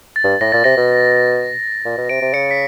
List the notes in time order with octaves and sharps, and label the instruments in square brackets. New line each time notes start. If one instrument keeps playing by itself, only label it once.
[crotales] A6
[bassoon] G2
[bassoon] A2 [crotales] A#6
[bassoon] A#2 [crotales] A6
[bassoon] C3 [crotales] A#6
[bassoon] B2
A#2
B2
[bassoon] C3 [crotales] D7
[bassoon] C3
[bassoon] C#3 [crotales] C#7
[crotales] B6